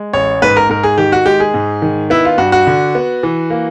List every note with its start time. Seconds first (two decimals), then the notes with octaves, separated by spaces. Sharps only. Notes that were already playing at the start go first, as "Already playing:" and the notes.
Already playing: G#3
0.13 A1 C#5
0.42 G#2 B4
0.56 A#4
0.69 G#2 A#4
0.83 G#4
0.98 D#3 G4
1.12 F#4
1.26 G#3 G4
1.40 G#4
1.54 G#2
1.82 D#3
2.10 B3 E4
2.25 F4
2.38 G2 F#4
2.52 F#4
2.67 D3
2.95 B3
3.23 E3
3.50 A#3